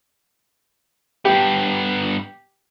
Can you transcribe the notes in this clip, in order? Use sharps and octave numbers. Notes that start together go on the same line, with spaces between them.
G2 B3 G4